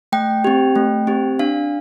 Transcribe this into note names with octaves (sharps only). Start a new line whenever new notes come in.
A3 G5
C4 G4
A3
C4 G4
D4 F5